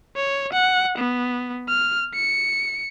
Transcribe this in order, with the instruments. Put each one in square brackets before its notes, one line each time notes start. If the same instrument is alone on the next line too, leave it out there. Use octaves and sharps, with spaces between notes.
[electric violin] C#5
F#5
B3
F6
C#7